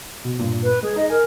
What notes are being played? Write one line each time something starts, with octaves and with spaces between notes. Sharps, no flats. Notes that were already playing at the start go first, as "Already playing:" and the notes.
B2
G2 A#2
B4
G#3 G#4
D#4 D#5
A#4 G#5